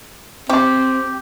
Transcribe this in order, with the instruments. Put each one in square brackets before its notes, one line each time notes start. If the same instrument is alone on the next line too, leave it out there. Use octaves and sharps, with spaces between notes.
[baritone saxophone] C4 [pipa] G4